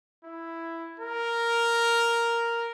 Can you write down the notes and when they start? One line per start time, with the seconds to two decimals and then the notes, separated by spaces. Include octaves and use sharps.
0.24 E4
1.00 A#4